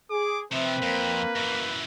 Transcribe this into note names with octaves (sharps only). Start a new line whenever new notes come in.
G#4 D6
C3 F3 C4 B4 E5
F2 A#3
F#2 E3